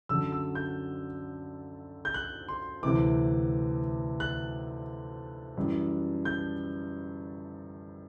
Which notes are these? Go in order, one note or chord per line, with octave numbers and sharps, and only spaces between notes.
F#2 D3 F#3 E6
E6
G6
G6
F#6
C6
D2 C3 E3 D6
F#6
F#2 E3 G3
G6